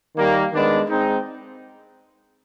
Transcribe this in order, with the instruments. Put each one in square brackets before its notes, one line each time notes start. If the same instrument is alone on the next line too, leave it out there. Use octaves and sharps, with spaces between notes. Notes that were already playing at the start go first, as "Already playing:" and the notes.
[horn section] D#3 G3 A#3
D#3 G#3 B3 D4
G#3 C4 D#4